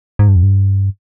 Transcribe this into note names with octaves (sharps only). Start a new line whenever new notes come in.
G#2
G2
F2
G2